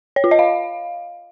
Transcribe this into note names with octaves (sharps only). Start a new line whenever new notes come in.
C#5
F4
D#5
F5